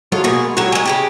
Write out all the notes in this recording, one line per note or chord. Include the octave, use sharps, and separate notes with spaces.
F#3 G#3 F4 A4
B2 G#3 A#3 F#4 G#4
F#3 G3 A3 F#4 C#5
F#3 G#3 G#5
C#3 G#3 G4